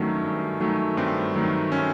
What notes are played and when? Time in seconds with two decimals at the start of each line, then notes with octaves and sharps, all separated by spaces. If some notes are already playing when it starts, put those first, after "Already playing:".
Already playing: G2 D#3 F#3 A3 C#4
0.23 G2
0.60 D#3 F#3 A3
0.97 G2 C4
1.34 D#3 F#3 A3
1.72 C#4